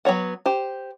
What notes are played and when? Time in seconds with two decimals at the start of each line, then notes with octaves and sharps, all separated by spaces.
0.05 F#3 B3 C#5 F#5
0.46 G4 C5